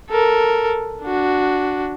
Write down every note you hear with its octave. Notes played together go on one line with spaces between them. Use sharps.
A4 A#4
D4 F#4